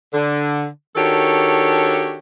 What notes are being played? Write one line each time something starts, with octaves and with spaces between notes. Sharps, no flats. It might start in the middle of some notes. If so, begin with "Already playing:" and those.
D3
D#3 D4 F#4 G4 A4 C#5